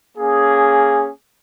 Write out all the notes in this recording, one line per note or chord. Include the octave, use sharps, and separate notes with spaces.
A#3 C#4 G#4